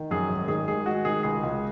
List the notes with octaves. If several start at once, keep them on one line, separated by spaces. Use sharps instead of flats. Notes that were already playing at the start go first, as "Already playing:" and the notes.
Already playing: D#3
F#2 G#4
G#1
D#3 G#4
G#3 G#4
G#3 F#4
D#3 G#4
C#2 G#4
C#2